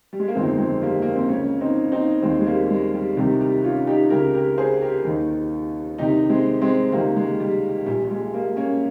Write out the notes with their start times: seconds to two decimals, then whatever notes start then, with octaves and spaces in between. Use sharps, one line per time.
0.13 G3
0.20 G#3
0.28 A#3
0.35 G1 F2 D#3 G#3 C4
0.58 G#3 C4
0.82 G3 A#3
1.02 A#3
1.16 C4
1.29 C#2 C#3 A#3 C#4
1.61 C4 D#4
1.92 C4 D#4
2.22 D#2 D#3 G#3 C4
2.41 G#3
2.46 G3 A#3
2.65 G3
2.70 G#3
2.94 G3
3.17 C2 C3 D#3 G3
3.41 G3
3.63 C#4 F4
3.87 D#4 G4
4.10 C#2 C#3 G4 A#4
4.34 G4 A#4
4.58 G#4 C5
4.81 G4 A#4
5.05 D#2 D#3
5.98 C2 C3 D#3 D#4 G4
6.29 G#3 C4
6.61 G#3 C4
6.92 C#2 C3 D#3 G3 A#3
7.17 G#3
7.40 G3
7.86 A#1 A#2 G3
8.05 G3
8.11 G#3
8.33 G3 A#3
8.57 A#3 C#4